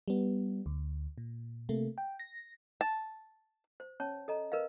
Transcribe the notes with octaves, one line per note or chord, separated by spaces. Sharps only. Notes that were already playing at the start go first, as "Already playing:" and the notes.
G3 B3
D2
A#2
C3 A3 A#3
G5
A#6
A5
C5
C#4 C#5 A5
A4 D#5 A#5
A#4 B4 D#5 F5